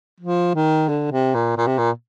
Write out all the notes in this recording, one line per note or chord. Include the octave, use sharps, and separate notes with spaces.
F3
D#3
D3
C3
A#2
A#2
C3
A#2